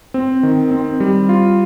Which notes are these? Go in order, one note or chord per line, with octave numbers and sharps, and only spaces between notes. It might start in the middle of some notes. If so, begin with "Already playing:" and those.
C4
D#3
C4
G3
F4